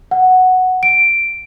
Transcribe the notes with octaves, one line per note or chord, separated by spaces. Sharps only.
F#5
D7